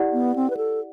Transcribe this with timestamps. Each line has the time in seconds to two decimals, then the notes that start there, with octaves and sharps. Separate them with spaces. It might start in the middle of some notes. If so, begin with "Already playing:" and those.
Already playing: E4 G4 D5 F#5
0.13 B3
0.35 C4
0.50 B4
0.57 A4